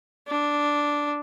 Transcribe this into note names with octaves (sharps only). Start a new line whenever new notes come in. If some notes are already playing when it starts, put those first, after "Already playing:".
D4